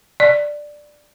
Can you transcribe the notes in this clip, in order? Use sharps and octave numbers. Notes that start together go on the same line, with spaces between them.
D5